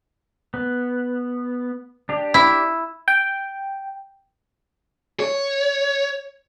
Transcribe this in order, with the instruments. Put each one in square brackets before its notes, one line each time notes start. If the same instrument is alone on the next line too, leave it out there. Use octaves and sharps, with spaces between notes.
[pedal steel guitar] B3
D4 G4
[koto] E4
[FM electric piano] G5
[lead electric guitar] C#5